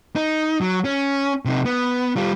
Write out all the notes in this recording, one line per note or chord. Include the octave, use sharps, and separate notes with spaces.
D#4
F#3
C#4
C3 D#4
B3
G3 F4